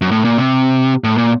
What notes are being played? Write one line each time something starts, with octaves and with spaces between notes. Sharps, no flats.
F#2
A2
A#2
C3
A2
A#2